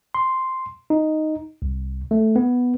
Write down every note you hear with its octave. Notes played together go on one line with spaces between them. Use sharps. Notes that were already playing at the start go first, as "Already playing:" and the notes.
C6
D#4
C2
A3
B3